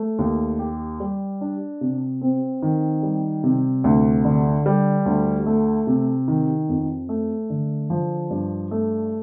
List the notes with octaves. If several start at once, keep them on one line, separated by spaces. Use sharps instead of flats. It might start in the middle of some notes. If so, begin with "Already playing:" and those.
Already playing: A3
D#2
G4
G3
D4
C3
C4
D#3
G3
C3
D2
D3
G3
D2
A3
C3
D#3
F2
A3
D3
F3
G2
A3